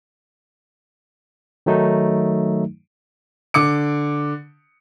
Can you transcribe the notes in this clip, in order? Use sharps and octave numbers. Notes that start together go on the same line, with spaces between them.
D#3 F#3 A3 D#4
D3 D6 C#7